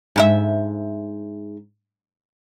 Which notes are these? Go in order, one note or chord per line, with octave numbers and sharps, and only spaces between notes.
G#2 A#4 E5